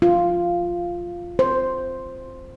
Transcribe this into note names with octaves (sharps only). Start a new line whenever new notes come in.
F4
C5